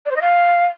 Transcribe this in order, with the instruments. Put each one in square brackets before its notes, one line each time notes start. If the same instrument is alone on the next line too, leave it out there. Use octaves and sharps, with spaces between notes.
[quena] D5
C5
D#5
F5